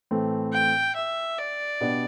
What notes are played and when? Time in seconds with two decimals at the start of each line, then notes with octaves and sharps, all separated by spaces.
0.11 A2 E3 A3 C4
0.53 G5
0.96 E5
1.38 D5
1.81 B2 B3 D4 G4